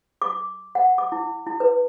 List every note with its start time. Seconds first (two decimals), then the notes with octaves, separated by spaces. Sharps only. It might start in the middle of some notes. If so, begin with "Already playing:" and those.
0.22 D6
0.75 F#5
0.98 D6
1.12 E4
1.47 E4
1.60 B4